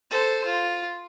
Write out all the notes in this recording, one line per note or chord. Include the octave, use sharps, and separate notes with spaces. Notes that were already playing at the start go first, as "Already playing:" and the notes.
A4 C5
F4